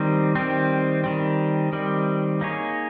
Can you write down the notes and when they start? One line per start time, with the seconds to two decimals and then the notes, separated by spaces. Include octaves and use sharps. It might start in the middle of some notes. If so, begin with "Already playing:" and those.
Already playing: D#3 G3 C4
0.35 D#3 G3 C4
1.04 D#3 G3 C4
1.73 D#3 G3 C4
2.41 A#3 D#4 G#4 C#5